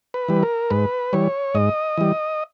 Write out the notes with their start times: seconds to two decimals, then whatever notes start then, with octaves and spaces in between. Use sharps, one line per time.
0.14 B4
0.28 E3 G3
0.43 A#4
0.70 G#2 B4
1.13 E3 G3 C#5
1.55 G#2 D#5
1.98 E3 G3